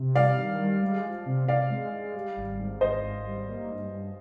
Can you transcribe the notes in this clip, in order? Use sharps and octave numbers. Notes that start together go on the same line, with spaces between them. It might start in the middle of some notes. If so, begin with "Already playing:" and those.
Already playing: C3
G3 D5 F5
D#3
G3
G#3
F3
C3
C3 D5 F5
G#3
G#3
G3
G#1
G#2
G#1 C5 D#5
G#1
G3
A#3
G2
G2